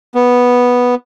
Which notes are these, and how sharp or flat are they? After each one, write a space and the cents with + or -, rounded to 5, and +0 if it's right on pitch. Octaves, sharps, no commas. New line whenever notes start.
B3 -5